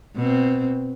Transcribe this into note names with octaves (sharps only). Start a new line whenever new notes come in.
B2 C4